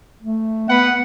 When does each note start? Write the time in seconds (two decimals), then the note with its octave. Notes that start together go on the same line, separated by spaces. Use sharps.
0.23 A3
0.69 B3 B4 F#5